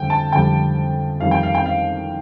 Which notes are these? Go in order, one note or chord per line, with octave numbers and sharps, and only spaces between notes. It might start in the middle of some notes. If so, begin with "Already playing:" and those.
Already playing: F2 D3 G3 G5
A5
F2 D3 G3 G5
F2 D#3 G3 F5
G5
F5
G5
F5